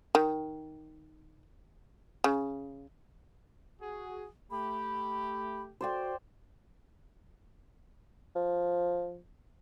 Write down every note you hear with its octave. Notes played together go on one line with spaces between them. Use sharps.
D#3
C#3
F#4 G#4
A3 G4 B5
F#4 C5 D5 G5
F3